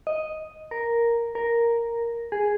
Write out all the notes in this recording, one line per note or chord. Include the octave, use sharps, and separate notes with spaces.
D#5
A#4
A#4
G#4